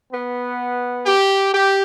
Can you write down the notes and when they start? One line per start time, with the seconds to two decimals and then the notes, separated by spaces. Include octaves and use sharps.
0.13 B3
1.06 G4
1.53 G4